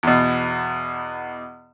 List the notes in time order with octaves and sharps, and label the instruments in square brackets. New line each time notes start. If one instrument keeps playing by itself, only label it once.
[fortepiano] E2 B2